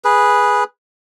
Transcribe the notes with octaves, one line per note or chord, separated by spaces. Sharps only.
G#4 B4